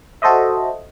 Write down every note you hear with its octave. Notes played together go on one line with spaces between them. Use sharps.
F#4 A4 C5 D#5 E5